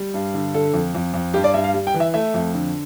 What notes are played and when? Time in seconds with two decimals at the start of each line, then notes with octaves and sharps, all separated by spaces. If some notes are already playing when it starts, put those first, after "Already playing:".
Already playing: G3
0.14 G2
0.34 D3
0.54 D3 A4
0.74 F2
0.95 F2
1.14 F2
1.34 G2 G4
1.44 D5
1.54 G2 E5
1.64 F5
1.74 G3
1.87 G5
1.94 E3
2.00 E5
2.14 A3 E5
2.34 F2
2.54 D3